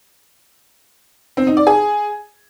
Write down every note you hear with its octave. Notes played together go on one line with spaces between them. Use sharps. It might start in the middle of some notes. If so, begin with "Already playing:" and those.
C4
D#4
D5
G#4